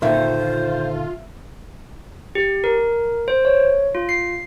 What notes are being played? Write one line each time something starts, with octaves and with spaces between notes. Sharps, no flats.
A#2 D3 D#3 F4 C5 E5
G4
A#4
C5
C#5
F4
C7